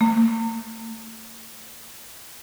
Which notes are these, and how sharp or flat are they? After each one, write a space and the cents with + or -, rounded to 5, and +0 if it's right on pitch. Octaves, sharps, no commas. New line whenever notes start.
A3 +45